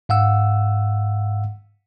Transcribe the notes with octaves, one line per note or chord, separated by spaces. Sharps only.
G#2 F5 F#5 E6